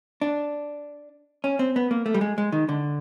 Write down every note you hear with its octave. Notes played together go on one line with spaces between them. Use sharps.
D4
C#4
C4
B3
A#3
A3
G3
G#3
G#3
D#3
D3